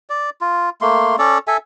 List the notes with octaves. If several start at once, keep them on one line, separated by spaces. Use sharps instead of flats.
D5
F4
A3 A#3 C6
C#4 A4 D5
A4 E5 G#5